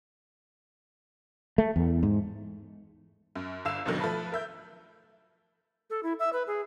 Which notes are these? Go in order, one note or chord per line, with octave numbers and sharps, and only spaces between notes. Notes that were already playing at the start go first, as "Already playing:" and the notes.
A3
E2
G#2
F#2
G1 F5 E6 E7
G#1 D#2 B2 D3 D#3 F#3
F3 A3 B4 A5 B5
A#4 E5 G6
A4
E4
E5
B4
G#4